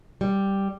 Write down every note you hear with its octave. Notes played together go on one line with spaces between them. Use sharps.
G3